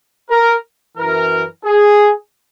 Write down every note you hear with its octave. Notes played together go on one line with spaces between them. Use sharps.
A#4
F#2 E3 A#4
G#4